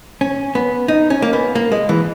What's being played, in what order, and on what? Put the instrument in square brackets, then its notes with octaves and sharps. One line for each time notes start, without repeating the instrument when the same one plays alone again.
[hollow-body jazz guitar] C#4
B3
D#4
C#4
A#3
B3
A#3
G#3
E3